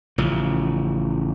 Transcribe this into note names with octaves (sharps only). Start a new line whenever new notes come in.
A1 C#3 F3